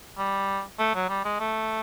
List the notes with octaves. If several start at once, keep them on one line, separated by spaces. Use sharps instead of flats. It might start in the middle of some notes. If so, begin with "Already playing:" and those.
G3
A3
F#3
G3
G#3
A3